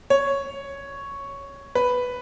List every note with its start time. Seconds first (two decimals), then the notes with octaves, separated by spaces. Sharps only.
0.10 C#5
1.75 B4